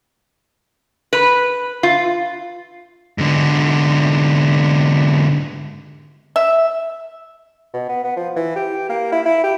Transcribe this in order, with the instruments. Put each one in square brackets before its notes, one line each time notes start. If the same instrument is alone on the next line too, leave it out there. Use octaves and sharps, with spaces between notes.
[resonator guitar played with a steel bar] B4
F4
[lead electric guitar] G#2 D3
[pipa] E5
[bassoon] B2
B3
B3
F3
E3
G4
A#3
E4
E4
G4